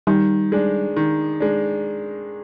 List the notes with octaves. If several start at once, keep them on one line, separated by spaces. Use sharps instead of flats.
D#3 G3
G#3 D4
D#3
G#3 D4